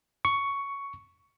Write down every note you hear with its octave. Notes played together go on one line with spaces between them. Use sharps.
C#6